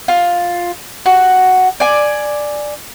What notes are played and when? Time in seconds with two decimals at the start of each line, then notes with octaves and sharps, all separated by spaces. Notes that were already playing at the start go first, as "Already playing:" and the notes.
0.08 F4
1.06 F#4
1.80 D5 G#5